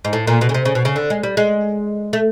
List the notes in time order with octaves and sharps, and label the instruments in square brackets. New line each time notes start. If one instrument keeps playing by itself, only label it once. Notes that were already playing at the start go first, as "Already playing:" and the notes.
[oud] G#2
A2
A#2
B2
C#3
C3
C#3
B2
C#3
D3
G#3
G3
G#3
A3